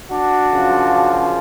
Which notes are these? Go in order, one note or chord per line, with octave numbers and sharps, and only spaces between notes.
D4 F#4
F#2 C#3 F3